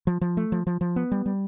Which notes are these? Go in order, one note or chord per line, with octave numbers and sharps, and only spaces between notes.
F3
F3
A3
F3
F3
F3
B3
G3
G3